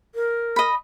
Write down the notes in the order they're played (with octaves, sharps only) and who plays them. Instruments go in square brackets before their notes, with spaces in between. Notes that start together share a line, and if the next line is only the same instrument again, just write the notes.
[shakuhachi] A#4
[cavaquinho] D#5 B5